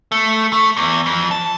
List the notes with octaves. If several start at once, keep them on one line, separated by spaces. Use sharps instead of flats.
A3
A3
E2
F2
A5